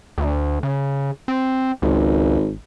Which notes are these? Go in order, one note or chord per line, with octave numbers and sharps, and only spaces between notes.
D2
C#3
C4
G#1 C#2